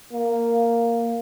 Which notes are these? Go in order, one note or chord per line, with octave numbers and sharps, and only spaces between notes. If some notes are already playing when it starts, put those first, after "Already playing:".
A#3